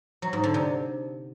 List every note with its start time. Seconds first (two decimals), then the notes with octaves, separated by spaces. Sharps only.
0.22 F#3
0.33 G#2
0.44 D3
0.54 C3